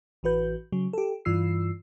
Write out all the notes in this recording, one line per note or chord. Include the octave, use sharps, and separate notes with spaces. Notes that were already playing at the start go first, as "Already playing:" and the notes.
A1 E3 F#4 B4 G6
C#3 F#3
G4 A4
G2 E3 F4 E6 C7